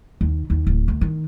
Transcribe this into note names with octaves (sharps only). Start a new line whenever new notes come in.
D#2
D#2
D1
D2
D#3